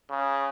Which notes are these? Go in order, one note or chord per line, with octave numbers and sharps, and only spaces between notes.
C#3